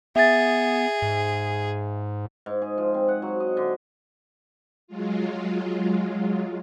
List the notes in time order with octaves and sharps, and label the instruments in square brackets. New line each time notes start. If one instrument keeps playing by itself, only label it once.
[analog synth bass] B3 [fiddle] G#4 [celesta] E5 A6
[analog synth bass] G#2
[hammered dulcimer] G#2
G#4
F3
C4
F#5
F#3
D#5
D3
[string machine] F#3 G#3 F4